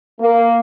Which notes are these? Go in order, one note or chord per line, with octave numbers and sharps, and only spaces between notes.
A#3